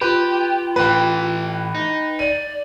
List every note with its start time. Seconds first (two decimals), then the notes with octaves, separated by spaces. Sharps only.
0.01 F4 G4 B4
0.76 A2 E3 B4 G5
1.75 D#4
2.19 D5 D#7